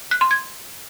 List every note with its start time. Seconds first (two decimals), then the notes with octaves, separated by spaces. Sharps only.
0.11 F#6
0.21 C6
0.31 G#6